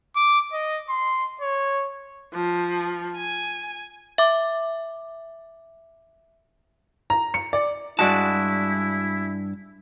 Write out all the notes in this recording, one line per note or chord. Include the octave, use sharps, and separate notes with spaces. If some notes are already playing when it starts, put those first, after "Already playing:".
D6
D#5
C6
C#5
F3
G#5
E5 D6
A#5
C#7
D5
G2 G#3 E4 F#4 D5 A5